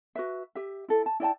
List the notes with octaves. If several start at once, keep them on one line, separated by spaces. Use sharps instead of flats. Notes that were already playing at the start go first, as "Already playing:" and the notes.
F#4 B4 E5
G4 E5
E4 A4
A5
E4 D5 G5 A5